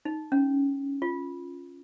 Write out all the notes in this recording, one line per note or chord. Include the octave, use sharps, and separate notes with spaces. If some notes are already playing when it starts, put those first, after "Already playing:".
D#4
C#4
F4